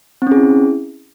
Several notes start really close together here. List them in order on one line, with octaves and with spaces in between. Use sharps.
C4 C#4 G#4 E4